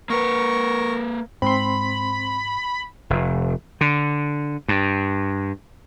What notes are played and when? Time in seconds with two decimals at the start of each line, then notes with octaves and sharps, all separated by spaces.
0.10 A#3 A#4 B4 C#6
1.42 G#2 G#3 C4 B5 C6
3.10 F1
3.81 D3
4.68 G2